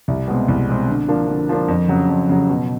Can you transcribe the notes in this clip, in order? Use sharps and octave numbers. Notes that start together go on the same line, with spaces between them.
C2
B2 G#3 C4
C2
B2 G#3 C4
D3
F3 A#3 D4
D3
F3 A#3 D4
F2
C#3 F#3
F2
C#3 F#3
B2